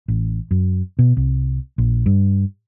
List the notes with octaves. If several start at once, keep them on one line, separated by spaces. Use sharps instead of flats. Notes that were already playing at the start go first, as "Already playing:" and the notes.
A1
F#2
B2
C2
A#1
G2